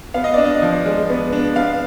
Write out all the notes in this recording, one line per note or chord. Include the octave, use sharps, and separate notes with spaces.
B3 F5
D#5
D4 D5
D#5
F3
G#3
B3
D4
B3 F5